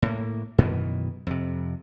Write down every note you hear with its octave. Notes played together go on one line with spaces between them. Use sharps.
A2 A#3
F#2 B2 D#3 E3
F2 C3